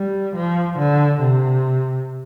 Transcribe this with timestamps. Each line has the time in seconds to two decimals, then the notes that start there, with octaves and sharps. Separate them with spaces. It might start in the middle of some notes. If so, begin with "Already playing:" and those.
Already playing: G3
0.35 F3
0.78 D3
1.21 C3